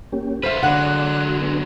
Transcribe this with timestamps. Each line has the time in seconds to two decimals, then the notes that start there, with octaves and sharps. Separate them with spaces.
0.12 A#3 C#4 G4
0.43 D3 F4 A4 B4 C5 E5 F6
0.63 D3 F#3 G#3 D5 F5 F#5 F#6
1.28 F#4
1.41 B3 D4